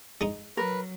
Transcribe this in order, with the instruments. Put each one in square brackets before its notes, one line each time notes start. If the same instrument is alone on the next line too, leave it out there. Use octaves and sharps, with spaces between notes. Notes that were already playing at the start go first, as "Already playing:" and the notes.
[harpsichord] G#3 D#4
[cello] F#3 [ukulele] A#4 [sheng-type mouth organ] B4